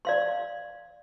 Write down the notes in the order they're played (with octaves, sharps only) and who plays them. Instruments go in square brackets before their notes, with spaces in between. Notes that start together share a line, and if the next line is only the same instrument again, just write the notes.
[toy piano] D5 F5 C6